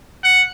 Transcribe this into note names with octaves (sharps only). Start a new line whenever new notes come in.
F#5